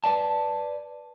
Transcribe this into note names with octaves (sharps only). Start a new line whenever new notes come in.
B4 D5 A5